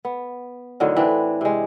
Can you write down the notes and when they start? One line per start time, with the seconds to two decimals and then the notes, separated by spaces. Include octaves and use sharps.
0.05 B3
0.80 A2 D3 D#3 F#3
0.96 E3 C4 D4 B4
1.41 C3 G#3